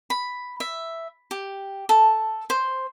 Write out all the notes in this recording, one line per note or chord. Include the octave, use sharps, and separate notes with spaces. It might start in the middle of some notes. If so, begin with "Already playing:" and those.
B5
E5
G4
A4
C5